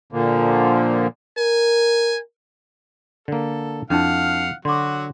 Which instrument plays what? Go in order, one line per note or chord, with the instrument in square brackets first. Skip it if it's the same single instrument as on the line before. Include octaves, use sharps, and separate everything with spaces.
[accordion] A#2 D3 F3 A#3
[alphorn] A#4 [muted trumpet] G#5
[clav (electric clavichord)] D3 A#3 [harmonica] A4
[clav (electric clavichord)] F2 [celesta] D4 E4 A5 [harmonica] F5 F#5
[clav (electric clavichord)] D3 [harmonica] F#3 F#4 [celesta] C6 D6